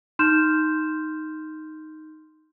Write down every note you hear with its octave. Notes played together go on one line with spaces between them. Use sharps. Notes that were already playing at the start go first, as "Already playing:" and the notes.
D#4 C6 F6 G6 E7